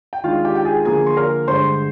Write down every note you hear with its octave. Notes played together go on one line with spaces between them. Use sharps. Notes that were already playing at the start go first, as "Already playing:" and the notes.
G5
D#3 G#3 D4 F4 F5
G4 G5
G5
G#4 G#5
D3 F3 A#3 G#4 G#5
C6
A#4 A#5
G2 D3 G#3 C5 C6